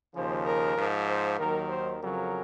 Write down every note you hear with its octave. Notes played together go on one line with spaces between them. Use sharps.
D#2 C#3 F3 C5
A#4
G#2 F3
C5
D#2 D#3 F#3 A#4
C5
F2 C#3 F#3 A#4